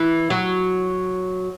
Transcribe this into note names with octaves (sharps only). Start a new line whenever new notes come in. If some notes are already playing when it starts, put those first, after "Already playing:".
Already playing: E3
F#3